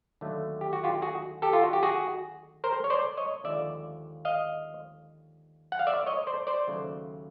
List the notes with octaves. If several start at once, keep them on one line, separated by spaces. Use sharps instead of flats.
D#2 D3 F#3 A3
G4
F#4
F4 G4
F#4 G#4
G4 A4
F4
F#4
G4
F#4 G#4
A#4 C5
C#5
C5 D5
C#5 D#5
D#2 D3 F3 G#3 D5 E5
D#5 F5
F#5
F5
D5 E5
C#5 D#5
C5 D5
C5 D5
D#2 C#3 F#3 A3